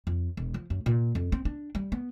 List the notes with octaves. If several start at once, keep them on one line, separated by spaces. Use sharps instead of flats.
F2
E1
F3
F#2
A#2
F2
C4
D4
G3
B3